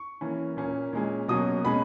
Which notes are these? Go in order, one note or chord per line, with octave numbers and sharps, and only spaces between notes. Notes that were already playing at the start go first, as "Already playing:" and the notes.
Already playing: C#6
E3 A#3 C#4
A#2 A#3 C#4
A#2 G#3 C#4
B2 F#3 A#3 C#4 D#6
B2 G#3 C#4 B5